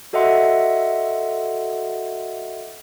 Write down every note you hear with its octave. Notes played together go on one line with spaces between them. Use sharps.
F#4 A4 D#5 E5 F#5 C6